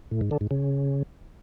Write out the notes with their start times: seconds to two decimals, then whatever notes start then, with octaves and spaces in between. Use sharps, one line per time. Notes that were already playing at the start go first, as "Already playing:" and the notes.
0.11 A2
0.21 G#2
0.31 D3
0.41 G#2
0.51 C#3